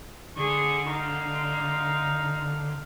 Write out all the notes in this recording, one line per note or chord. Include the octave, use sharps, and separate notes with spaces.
D3 G#4 C#6
D#4 F5